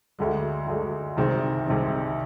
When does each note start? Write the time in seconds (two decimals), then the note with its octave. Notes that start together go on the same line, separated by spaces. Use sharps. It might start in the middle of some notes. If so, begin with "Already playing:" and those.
0.19 D2 D3 G#3
0.67 D2 D3 G#3
1.17 C2 C3 D#3 G#3 C4
1.66 C2 C3 D#3 G#3 C4